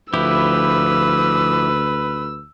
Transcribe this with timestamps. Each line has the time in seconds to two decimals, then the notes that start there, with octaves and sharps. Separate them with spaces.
0.14 D2 F3 E4 G4 B4 E6